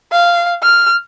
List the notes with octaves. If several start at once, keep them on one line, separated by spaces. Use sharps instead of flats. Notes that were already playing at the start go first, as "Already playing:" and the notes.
F5
F6